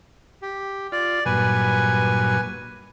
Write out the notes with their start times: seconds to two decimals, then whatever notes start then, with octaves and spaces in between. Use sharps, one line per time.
0.42 G4
0.92 F4 D5
1.26 G2 A#2 F#3 B4 G#5